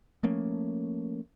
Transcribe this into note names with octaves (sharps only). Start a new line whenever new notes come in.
F3 A3 A#3 C#4